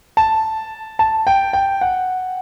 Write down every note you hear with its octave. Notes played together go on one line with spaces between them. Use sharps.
A5
A5
G5
G5
F#5